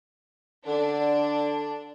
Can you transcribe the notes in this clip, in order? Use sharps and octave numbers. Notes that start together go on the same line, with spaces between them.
D3 D4